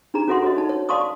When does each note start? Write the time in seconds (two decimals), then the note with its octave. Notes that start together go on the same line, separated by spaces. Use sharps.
0.14 D4 D#4 G#4 A#5
0.28 C#4 F#4 A4 E5 F#5 C6
0.42 F#4 C#5 D#5
0.56 D#4 A5
0.69 C#5
0.89 D5 F5 A5 C6 C#6 D#6